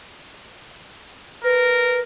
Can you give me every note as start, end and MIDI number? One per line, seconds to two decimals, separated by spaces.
1.44 2.00 70
1.44 2.01 71